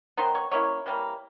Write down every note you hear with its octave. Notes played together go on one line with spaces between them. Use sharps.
D#3 F#3 B3 D#4 C5 C6
C#5 C#6
F#3 A#3 C#4 E4 C#5 C#6
C3 E3 G3 A#3